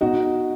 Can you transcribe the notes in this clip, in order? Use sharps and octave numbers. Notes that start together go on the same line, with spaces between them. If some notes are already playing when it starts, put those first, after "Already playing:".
B2 D#4 F#4